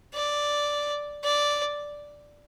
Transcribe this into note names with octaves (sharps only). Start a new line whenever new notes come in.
D5
D5